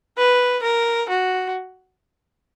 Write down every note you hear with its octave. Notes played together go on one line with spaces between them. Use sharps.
B4
A#4
F#4